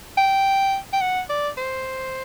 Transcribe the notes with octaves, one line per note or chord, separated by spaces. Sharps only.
G5
G5
F#5
D5
C5